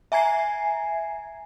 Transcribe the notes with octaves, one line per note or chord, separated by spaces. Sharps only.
E5 G#5 A#5 G#6 C7